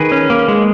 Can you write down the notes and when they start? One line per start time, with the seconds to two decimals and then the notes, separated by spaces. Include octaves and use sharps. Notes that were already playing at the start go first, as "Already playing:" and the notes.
Already playing: D#3 G#4 B4
0.12 C#4
0.30 A#3
0.48 G#3